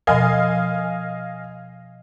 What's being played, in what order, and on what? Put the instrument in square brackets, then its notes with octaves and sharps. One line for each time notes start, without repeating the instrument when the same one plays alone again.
[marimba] B2 F3 A#4 [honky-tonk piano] D#5 F5 G#5